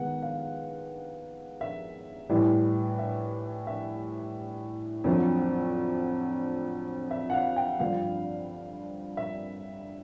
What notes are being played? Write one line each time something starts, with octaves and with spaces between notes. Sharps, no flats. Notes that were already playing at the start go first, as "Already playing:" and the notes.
Already playing: D#3 G#3 B3 F#5
F5
E5
A2 E3 G3
E5
E5
F2 D3 F#3 A3
E5
F#5
F5
G5
G2 D3 F3 F5
E5